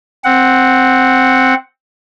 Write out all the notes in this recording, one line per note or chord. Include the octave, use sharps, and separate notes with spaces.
C4 F#5